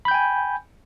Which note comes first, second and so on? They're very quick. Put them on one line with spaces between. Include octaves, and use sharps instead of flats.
B5 G6 G5 G#5